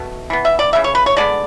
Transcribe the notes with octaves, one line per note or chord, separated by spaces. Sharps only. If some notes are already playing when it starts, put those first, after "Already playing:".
Already playing: B2 A3
E3 B3
E5
D5
C#3 E3 A3 E5
C#5
B4
C#5
D3 G#3 B3 D5